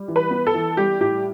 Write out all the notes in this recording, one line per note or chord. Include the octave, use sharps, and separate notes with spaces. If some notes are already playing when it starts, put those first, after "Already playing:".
Already playing: G3
E3
B4
B3
A4
E3
G3 G4
A2 G4